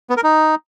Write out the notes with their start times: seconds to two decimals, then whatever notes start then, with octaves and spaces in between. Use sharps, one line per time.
0.10 B3
0.17 A#4
0.24 D#4